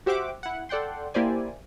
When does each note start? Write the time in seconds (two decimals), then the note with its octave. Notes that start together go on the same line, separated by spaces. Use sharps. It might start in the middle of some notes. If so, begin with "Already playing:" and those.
0.06 F#4 G4 C5 E5 F#5 D6
0.43 E4 F#5
0.69 A4 D5 F#5 G5 C6
1.14 A#3 E4 G4 C5 D5 G#5